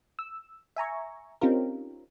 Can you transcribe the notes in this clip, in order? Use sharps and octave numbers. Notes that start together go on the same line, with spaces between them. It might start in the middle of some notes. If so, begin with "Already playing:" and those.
E6
E5 G#5 A#5 C#6
C4 C#4 D#4 F4 G4 A#4